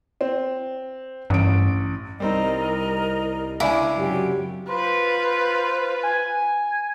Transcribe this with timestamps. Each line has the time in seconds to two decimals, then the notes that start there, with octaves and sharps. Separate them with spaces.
0.21 C4
1.30 A1 G2 D7
2.20 C2 G3 C4 D#4 A#4 D#5
3.60 C#2 D4 E4 G#5 D6
3.97 F#2 C3 F#3 G4
4.68 F4 B4 C5
6.03 G#5